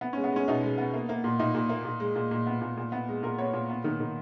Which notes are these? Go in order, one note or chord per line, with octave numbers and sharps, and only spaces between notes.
B3
G#3 C#4
B3
G#3 C#4
B2 D#4
G#3
B3
A#3
A#3
A#2
A#2 D#4
A#2
A#3
A#2
G#3
A#2
A#2
B3
A#2
A#2
B3
G#3
A#2 A#4
B3 C#5
A#2
B3
D#3
D#3